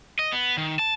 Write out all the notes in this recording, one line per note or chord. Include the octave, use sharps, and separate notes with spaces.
D#5
B3
D#3
A5